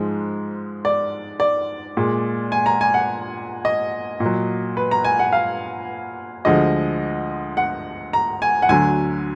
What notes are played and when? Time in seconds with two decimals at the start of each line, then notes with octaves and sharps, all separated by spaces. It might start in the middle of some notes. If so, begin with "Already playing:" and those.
Already playing: G#2 F3 G#3
0.85 D5
1.40 D5
1.97 A#2 G#3
2.52 G#5
2.66 A#5
2.81 G#5
2.94 F#5
3.65 D#5
4.20 A#2
4.26 F#3
4.77 B4
4.91 A#5
5.05 G#5
5.19 F#5
5.33 F5
6.45 D2 D3 F3 G#3 D#5
7.57 F#5
8.13 A#5
8.42 G#5
8.62 F#5
8.69 D2 D3 F#3 G#5